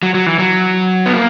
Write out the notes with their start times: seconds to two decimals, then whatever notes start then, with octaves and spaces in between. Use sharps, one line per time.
0.03 F#3
0.14 F#3
0.26 E3
0.39 F#3
1.06 B3
1.13 A#3